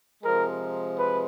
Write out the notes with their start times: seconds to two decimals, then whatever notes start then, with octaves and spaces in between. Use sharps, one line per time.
0.23 C3 F3 G#3 A#4
0.96 B4